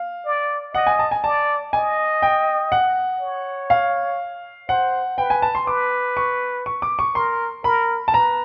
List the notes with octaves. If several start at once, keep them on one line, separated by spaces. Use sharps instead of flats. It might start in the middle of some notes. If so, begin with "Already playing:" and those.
Already playing: F5
D5
D#5 F#5
G#5
A5
G#5
D5 A5
D#5 G#5
G5
F#5
C#5
F5
C5 F#5
B4 G5
G#5
A5
C6
B4 D6
C#6
C#6
D6
C#6
A#4 C6
A#4 B5
A5
B4 A#5